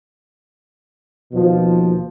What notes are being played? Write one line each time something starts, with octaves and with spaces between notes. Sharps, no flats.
D#2 B2 F3